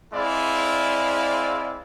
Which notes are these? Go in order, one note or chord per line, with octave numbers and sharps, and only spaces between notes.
G#3 C4 E4 D5 F5